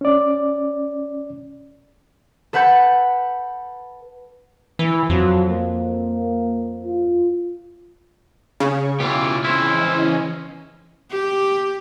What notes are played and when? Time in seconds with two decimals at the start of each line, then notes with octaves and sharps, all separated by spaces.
0.01 C#4 D5
2.53 A4 B4 F#5 B5 G6
4.79 E3
5.10 F2 F#3
5.50 A#3
6.85 F4
8.60 C#3 C#6
9.00 B2 E3 F4 G4
9.44 E3 C4 C#4 E4 C5 D#5
11.10 G4